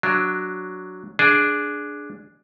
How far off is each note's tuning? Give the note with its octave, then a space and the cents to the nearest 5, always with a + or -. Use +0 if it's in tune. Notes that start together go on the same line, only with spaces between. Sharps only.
F#3 +0 D4 +0
D4 +0 G#4 +10